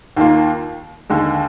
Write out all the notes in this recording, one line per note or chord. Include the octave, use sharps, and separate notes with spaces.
D#2 D#3 A#3 F4
D#2 D3 G#3